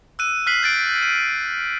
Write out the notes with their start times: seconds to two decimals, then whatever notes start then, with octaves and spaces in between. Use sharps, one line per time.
0.19 E6 F#6 D#7
0.47 F6 F#6 B6 C7 F#7
0.63 G6 A6 D7
1.02 D#7